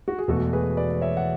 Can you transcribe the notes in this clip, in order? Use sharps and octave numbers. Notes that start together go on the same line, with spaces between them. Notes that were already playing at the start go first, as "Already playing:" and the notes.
F#4
G#4
E1 E2 B2 A3 F#4 A4
G#4 B4
B4 D5
C#5 E5
F#5